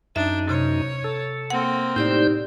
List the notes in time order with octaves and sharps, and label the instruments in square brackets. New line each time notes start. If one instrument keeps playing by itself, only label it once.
[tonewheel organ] F#2 D#4 [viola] D4 [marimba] E5
[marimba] C3 [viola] C#5
[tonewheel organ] A4
[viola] A#3 C4 [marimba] F#5
[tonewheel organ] A2 C5 G6 [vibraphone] D#4 G4 D5